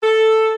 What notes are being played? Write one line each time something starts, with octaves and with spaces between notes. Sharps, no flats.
A4